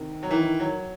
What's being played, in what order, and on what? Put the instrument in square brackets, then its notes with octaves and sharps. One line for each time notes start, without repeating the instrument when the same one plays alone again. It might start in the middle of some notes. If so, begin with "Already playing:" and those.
Already playing: [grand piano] C3 [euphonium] D#3
[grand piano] F#3
[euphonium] D#3 [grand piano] E3
[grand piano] F#3